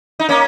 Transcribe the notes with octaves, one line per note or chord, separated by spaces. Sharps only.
D#4
A#3 C#4